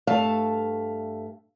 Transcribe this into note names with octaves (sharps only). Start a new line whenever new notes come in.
G2 A3 E5 F5 A5